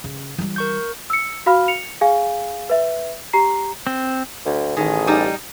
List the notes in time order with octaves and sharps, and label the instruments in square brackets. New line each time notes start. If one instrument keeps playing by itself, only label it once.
[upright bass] C#3
E3 G3
[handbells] A#4 C#6 G6
[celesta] E6 C#7
F#4 F5 B5 F6
C#7 F7
G#4 F5 G#5
B4 E5
G4 A#5 C7
[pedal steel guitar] C4
[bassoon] D2
[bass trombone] A1 [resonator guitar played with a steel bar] D#3 [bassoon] G#4
[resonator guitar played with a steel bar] G3 D#4